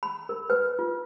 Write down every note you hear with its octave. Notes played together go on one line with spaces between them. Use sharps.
B5
A#4
B4
F4